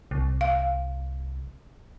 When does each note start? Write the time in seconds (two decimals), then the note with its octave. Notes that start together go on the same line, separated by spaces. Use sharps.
0.11 C2
0.41 F5